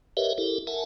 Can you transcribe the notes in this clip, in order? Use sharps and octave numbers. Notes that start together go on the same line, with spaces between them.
G4 A#4 B4 C#5 D#5 E5
E4 G4 A4 A#4
A#4 E5 F#5 G#5 A5